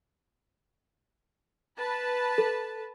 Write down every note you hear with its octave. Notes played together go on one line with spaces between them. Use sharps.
B4 A5
A4